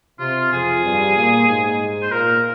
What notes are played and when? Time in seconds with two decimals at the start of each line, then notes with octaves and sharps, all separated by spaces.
0.19 C3 F4
0.52 F2 F3 G#4
0.84 G2 G3
1.16 A#2 A#3
1.48 G#2 G#3
2.02 C5
2.11 A#2 A#3 A#4